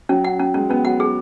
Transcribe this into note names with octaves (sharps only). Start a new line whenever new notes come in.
F#3 C#4
F#5
C#4
G#3 C#4
B3 C#4
F#3 F#5
G#4